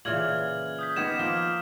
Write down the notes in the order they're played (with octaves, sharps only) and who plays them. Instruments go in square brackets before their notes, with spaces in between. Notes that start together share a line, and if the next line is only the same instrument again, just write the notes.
[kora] A#2 C#3 E3 [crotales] F6 G#6 F#7
[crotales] D#6 G6 B6
[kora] D#3 B3 [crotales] D6 G#6 E7
[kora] F3 A#3 [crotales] F6